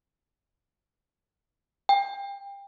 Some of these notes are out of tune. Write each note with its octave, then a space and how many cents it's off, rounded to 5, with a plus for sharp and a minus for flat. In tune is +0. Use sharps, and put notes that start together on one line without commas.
G5 +25